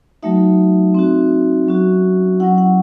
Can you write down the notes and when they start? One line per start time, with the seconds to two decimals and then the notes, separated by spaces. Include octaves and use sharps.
0.23 F#3 A3 D#4 F#4 E5
0.94 C4 D#4 F#4
1.67 F#3 C#4 F#4
2.40 F#3 C#4 E4 F#5
2.58 F#5